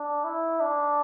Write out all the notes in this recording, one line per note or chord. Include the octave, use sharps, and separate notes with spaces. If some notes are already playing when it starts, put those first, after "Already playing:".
Already playing: D4
E4
D4